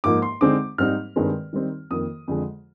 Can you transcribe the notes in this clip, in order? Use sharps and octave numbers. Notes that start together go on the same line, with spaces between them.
G#2 F3 A#3 D#4 D6
C6
D3 G#3 C4 D#4 D6
G#2 G3 C4 D#4 F6
G2 D#3 G#3 C4
D#3 G3 C4 D#4
F2 D#3 A#3 D#6
F2 D3 G#3